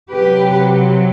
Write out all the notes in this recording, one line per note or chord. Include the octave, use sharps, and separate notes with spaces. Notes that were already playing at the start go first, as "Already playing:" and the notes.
C3 F#3 G4 B4